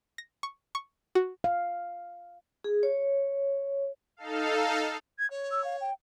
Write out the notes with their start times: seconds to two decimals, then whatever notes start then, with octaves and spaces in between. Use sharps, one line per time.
0.18 A#6
0.43 C#6
0.75 C#6
1.15 F#4
1.44 F5
2.64 G#4
2.83 C#5
4.17 D#4 A4 F5
5.18 G#6
5.30 C#5
5.51 E6
5.64 F5
5.81 G5